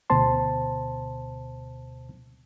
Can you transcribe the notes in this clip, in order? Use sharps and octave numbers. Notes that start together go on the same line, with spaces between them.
D2 B2 C5 A5 C6